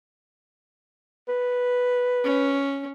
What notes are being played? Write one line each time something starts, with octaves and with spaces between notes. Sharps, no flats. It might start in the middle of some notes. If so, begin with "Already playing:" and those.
B4
C#4